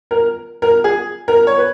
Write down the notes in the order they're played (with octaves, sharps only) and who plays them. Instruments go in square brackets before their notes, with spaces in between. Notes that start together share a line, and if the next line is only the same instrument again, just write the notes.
[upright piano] A#4
A#4
G#4
A#4
C#5
B4